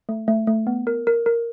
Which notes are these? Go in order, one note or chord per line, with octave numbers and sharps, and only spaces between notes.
A3
A3
A3
B3
A#4
A#4
A#4